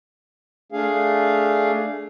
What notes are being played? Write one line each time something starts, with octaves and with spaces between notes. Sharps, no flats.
A3 D4 G#4 F5